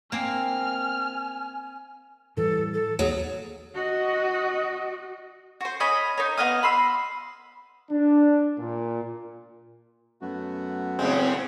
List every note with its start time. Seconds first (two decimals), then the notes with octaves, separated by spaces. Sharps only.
0.12 A#3 C4 A#4 G#5 F6
2.37 A2 E3 G3 A4
2.74 A4
2.99 D#2 F#3 A#3 G#4
3.75 F#4 D#5
5.61 F#4 C5
5.80 C#4 D#5 B5
6.17 D#4 A#4 C#5
6.37 B3 D#5 F5 D#6
6.63 B5 C6 E6
7.90 D4
8.58 A#2
10.21 F#2 A3 B3 F#4
10.99 A2 C#3 G#3 C4